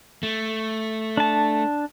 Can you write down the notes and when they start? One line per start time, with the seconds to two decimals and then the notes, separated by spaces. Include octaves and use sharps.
0.23 A3
1.17 D4 A5